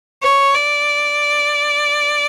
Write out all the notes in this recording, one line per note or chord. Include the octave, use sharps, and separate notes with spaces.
C#5
D5